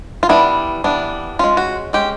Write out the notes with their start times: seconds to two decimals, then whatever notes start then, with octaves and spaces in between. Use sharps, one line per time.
0.23 F4
0.29 E3 G3 B3 D4 E4
0.84 E3 G3 B3 D4
1.39 G#3 C#4 F4
1.57 F#4
1.93 G#3 C#4 G4